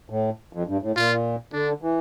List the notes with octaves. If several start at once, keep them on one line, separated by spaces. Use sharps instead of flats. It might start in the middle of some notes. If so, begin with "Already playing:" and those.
A2
F2
G2
A2
A#2 F4
D3 D4
E3